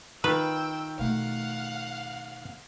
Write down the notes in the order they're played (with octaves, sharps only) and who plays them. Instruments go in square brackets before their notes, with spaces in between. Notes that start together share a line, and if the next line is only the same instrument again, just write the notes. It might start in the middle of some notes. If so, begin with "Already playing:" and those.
[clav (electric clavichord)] D#3 F4 [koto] B4 [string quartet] G5 E6
[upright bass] B2 A3 [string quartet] F5 F#5